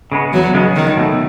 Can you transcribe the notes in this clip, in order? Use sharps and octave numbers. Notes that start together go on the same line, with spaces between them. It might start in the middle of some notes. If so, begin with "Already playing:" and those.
C#3 G#3 B3
E2 F#3
C#3 G#3 B3
C#2 D#3
B2 A3